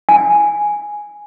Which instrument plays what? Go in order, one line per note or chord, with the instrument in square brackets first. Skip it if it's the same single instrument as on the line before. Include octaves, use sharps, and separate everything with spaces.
[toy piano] G#5